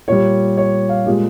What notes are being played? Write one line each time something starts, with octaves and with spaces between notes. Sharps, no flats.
A#2 G3 C#5
C#5
F5
A#2 G#3 G4